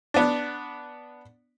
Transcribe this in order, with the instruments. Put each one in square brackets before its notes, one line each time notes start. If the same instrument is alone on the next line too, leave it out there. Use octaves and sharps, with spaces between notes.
[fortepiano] B3 D4